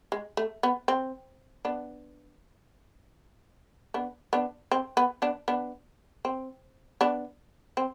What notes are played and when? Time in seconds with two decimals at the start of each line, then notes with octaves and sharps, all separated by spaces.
0.12 G#3
0.37 A3
0.63 B3
0.88 C4
1.65 B3 D4
3.94 B3 D4
4.33 B3 D4
4.71 C4
4.97 B3
5.22 B3 D4
5.48 B3 D4
6.25 C4
7.01 B3 D4
7.77 C4